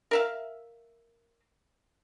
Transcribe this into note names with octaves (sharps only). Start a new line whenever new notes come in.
A#4 E5 F5